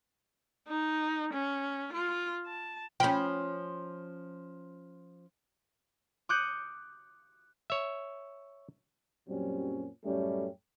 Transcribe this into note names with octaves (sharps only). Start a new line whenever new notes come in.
D#4
C#4
F4
A5
F3 C#4 G5 B5
D6 D#6 F#6 G6 C#7 D#7
C#5 E5
F#2 A#2 F#3 G3 C4 C#4
F#2 A2 G3 A3 C#4 G4